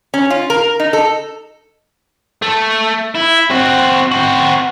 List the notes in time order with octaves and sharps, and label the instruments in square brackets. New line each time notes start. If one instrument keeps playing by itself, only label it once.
[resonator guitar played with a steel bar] C#4
F4
A#4
D#4
A4
[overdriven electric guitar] A3
E4
C4 F#4
C4 F#4